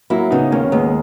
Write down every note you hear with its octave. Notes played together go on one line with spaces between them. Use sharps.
F#3 A#3 E4
C#3 B3 D#4
D#2 A#3 C#4
D#2 G#3 B3